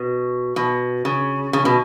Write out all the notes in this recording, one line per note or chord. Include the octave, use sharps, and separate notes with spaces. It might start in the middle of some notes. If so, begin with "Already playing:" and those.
Already playing: B2
B2
C#3
C#3
B2